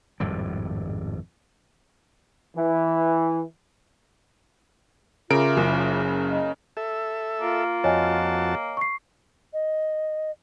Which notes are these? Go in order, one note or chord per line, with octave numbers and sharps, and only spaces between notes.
G#1 F2 A2 G3
E3
C#3 F4 A#4 E5 D6 D7
F#1
D#5
A4 E5
A#3 F4
F2 F#4 C#5 D#5 G#5 A5
C#6 C7
D#5